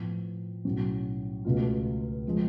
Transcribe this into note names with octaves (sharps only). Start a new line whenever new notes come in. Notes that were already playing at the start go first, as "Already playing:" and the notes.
Already playing: A2 F3 B3 F4
B1 A2 F#3 C#4 F#4
C#2 B2 A3 F4
F3 G#3